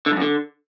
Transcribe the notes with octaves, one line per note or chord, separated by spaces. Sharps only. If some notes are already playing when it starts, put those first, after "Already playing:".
D3
G2
F#2
D3